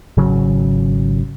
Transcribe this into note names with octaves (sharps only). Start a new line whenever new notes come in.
G#1 C#3 F#3